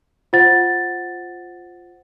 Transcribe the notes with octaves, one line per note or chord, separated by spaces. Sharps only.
F4 C5 F#5 A6